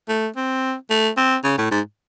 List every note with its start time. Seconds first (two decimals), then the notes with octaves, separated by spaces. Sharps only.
0.09 A3
0.36 C4
0.90 A3
1.17 C4
1.44 C#3
1.58 A2
1.71 G#2